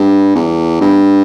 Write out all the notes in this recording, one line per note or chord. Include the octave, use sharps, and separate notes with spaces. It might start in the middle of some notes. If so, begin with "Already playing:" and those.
Already playing: G2
E2
G2